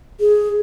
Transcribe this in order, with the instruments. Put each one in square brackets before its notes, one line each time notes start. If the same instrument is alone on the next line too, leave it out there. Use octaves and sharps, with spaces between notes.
[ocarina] G#4